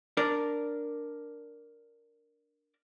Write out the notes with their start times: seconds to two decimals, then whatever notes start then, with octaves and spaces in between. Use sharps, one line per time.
0.17 D4 A#4 D5